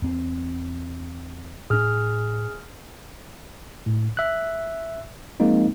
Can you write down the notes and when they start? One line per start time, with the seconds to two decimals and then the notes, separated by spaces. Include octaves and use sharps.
0.02 E2 C4
1.70 A2 D4 G#4 F6
3.86 A2
4.17 E5 F#6
5.40 F3 G#3 A#3 C4 D#4